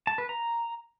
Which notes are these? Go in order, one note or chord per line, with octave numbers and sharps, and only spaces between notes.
A5
B4
A#5